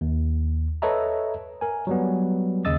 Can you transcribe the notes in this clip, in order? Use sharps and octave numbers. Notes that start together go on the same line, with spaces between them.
D#2
A4 B4 C#5 D#5 E5 A#5
A#4 G#5
F#3 G3 B3
D#2 C#3 D#5 D#6 E6 A6